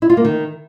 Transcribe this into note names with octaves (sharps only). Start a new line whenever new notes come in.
E4
F4
A#3
D#3